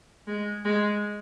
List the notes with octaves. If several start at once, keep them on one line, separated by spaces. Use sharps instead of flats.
G#3
G#3